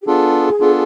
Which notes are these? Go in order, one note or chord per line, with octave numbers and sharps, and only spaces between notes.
G4
B3 D4 F4 G#4 A4
B3 D4 F4 A4